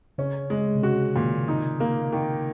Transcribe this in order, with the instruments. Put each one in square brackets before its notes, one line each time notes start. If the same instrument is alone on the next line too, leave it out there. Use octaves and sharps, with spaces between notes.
[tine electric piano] C#3 [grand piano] C#4
[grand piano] G#3
[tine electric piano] C3
[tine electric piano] C#3 [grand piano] F#4
[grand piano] A#2 [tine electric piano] D#3
[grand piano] D#4
A#3
D#3